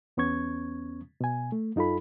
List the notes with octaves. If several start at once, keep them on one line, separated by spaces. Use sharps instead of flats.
E2 B3 C#4 C#6 G#6
B2 G#5
A3
F#2 D#4 F4 A4 B5